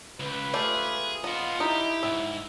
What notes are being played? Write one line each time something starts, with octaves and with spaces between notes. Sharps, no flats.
C#2 B4
A3 F4 G4 G#4
B3 F4 D#5 F#5
D#4 E4 G4
G#2 E5